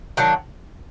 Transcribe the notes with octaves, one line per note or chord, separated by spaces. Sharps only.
D#3 F#3 A#3 D4